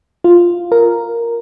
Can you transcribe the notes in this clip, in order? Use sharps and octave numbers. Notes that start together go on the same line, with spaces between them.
F4
A#4